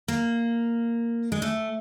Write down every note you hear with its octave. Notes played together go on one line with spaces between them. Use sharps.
A#3
G#3
A3